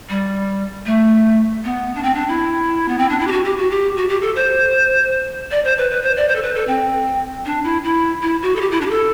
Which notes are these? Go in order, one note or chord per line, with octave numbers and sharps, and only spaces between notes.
G3
A3
B3
D4
C4
D4
E4
B3
C4
D4
E4
G4
F#4
G4
F#4
G4
F#4
G4
A4
C5
D5
C5
B4
B4
C5
D5
C5
A4
B4
A4
C4
D4
E4
E4
E4
F#4
A4
G4
E4
D4
G4
A4